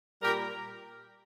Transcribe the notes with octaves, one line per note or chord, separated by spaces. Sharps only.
A#2 G3 G4 A#4